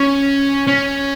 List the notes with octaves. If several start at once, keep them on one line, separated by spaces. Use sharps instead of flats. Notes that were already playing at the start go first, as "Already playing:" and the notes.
Already playing: C#4
C#4